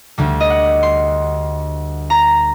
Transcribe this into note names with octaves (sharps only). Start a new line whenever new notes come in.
D2 D3 G3
D#5
F#5
C6
A#5